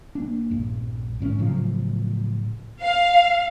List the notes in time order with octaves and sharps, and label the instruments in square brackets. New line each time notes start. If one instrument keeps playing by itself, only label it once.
[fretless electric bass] A#3 D4
A#1 G2
D1 G#2 C4 C#4
A2 C#3 F3 F#3
[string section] F5